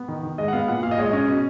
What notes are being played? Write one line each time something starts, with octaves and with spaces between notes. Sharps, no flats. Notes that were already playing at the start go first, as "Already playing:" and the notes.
Already playing: B3
D#3
D#3
G#3 D#5
F#5
B3 F5
A#2 F#5
A#2 F5
D#5
G#3 C#5
D#5
C#4
B2